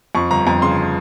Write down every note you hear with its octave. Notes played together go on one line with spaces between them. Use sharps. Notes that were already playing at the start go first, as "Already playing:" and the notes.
F2 C#6
G1 A#5
F2 A#5
C#3 C6